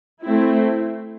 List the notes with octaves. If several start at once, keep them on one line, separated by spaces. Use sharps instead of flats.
A3 C4 E4